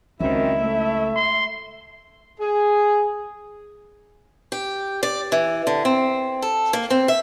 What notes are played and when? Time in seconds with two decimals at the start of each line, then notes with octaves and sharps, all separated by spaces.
0.20 C#2 F#2 D#3 C4 E4 E5
0.61 A3
1.16 C6
2.40 G#4
4.52 G4
5.03 D5
5.32 E3
5.67 D3
5.85 C4
6.42 A4
6.73 A#3
6.90 C4
7.08 E5